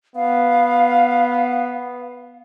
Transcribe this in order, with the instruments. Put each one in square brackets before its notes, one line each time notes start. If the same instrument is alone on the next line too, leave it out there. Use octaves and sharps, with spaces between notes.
[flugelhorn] B3 [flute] F5